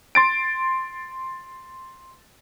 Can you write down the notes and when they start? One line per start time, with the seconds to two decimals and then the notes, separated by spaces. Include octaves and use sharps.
0.15 C6 A6 D7